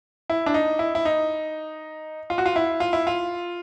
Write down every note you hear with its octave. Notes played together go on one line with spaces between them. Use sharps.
E4
D4
D#4
E4
E4
D#4
F4
F#4
F4
E4
F4
E4
F4